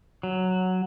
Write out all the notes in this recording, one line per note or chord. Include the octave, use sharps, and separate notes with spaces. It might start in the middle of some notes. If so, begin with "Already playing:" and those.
F#3